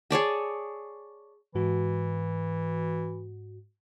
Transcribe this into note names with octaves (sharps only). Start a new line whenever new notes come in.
G#4 C#5 D5 A5
G#2 E3 F#4